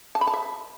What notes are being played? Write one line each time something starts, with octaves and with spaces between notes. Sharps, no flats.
A5
B5
A5
E5